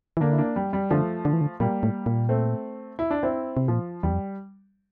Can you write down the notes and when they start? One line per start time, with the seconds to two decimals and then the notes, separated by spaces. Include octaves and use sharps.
0.17 E3
0.20 D3 A#3 D4
0.32 E4
0.38 A#3 D4
0.56 G3
0.73 G3
0.91 D3 F3 A3
1.25 D3
1.33 E3
1.41 D3
1.60 A#2 G3 A#3
1.83 A2
2.06 A#2
2.29 A3 C4
2.99 E4
3.11 D4
3.23 C4 E4
3.57 C3
3.68 A#2 F3
4.03 E2 G3
4.11 F2